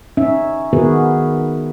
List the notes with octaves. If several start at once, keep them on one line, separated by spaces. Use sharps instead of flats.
C#4 D#4 E5
D#3 B3 F#4 G#4 A#4 B4